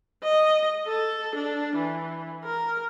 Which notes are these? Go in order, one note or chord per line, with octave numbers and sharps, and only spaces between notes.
D#5
A4
D4
E3
A#4